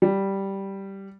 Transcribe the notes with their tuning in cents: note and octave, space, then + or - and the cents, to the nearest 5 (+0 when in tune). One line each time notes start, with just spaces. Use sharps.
G3 -5